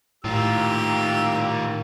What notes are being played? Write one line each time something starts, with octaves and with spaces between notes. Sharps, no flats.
A2 D#3 A#3 F4 G4 E6